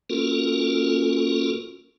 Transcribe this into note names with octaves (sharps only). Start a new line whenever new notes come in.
A#3 C#4 F4 F#4 A4 A#4